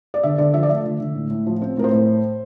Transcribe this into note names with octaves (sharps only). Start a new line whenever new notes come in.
D5
D3 E5
D3 D5
F3 E5
D5
A3 E5
D3
D3
A2
A2
F3
C4
A2 A#4
C5
A2